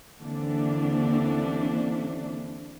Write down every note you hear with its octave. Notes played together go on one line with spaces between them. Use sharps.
D#2 D3 E3 A#3 C4 D4